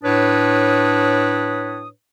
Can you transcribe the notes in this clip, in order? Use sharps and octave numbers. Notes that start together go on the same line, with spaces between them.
A2 D4 B4 C#5 D#6